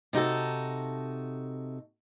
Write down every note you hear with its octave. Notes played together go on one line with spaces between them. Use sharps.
C3 D#4 F#4 A4